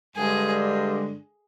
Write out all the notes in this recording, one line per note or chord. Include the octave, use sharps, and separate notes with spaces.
G2 D3 G#3 D4 G#4